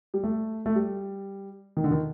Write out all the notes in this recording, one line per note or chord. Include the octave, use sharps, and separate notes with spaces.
G3
A3
A3
G3
D#3
D3
D#3